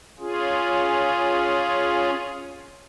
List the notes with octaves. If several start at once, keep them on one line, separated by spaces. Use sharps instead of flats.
C#4 F4 G#4